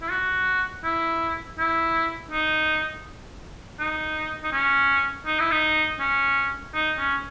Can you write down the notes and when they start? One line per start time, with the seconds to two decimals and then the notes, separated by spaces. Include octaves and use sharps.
0.02 E4
0.11 F#4
0.84 E4
1.59 E4
2.31 D#4
3.79 D#4
4.43 D#4
4.53 C#4
5.26 D#4
5.40 E4
5.51 D#4
6.00 C#4
6.74 D#4
6.99 C#4